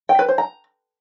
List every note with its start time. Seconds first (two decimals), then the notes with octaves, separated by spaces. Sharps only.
0.09 G5
0.19 B4
0.28 C5
0.38 A#5